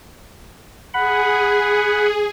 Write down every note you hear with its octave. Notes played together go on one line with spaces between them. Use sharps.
G#4 F#5 B5